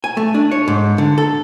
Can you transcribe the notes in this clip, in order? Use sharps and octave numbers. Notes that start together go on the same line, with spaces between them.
G#5
A3
D4
C#5
G#2
D3
A4